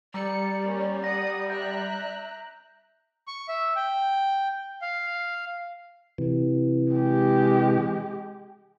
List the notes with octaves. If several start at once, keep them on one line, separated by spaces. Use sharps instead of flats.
G3 D5 A#5 D6 E6 C#7
A#3 C#4
F#5 D#6 A#6
E5 A#5 F#6 G6 D7
C#6
E5
G5
F5
C3 E3
G#3 G4